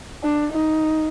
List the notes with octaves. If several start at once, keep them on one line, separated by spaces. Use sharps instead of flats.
D4
D#4